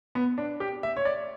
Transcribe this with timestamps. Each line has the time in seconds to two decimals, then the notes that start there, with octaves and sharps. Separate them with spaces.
0.15 B3
0.38 D4
0.60 G4
0.83 E5
0.97 C#5
1.05 D5